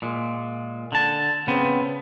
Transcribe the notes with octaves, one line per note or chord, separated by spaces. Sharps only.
A#2 G#3
D3 A5
C#3 B3 C4